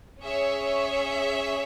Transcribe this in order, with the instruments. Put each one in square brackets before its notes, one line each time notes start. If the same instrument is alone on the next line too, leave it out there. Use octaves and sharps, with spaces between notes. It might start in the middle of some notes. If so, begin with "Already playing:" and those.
[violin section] C#4 G#4 C#5 E5